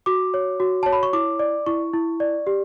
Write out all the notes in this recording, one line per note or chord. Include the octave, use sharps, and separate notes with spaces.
F#4 D6
C#5
F#4
C#5 A5
B5
C#6
E4 D6
D5
E4 C#6
E4
D5
G4